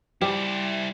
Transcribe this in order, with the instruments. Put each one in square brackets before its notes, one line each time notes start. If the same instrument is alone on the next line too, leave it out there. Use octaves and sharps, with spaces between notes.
[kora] G3 [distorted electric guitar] E4 C5